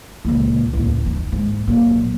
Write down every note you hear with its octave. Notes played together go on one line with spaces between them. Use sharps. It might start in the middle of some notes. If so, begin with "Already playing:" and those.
C#2 A#2
A1 D#2
D#3
G#2
A#2 F#3